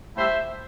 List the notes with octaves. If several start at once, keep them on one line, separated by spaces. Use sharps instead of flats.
A2 G3 C5 E5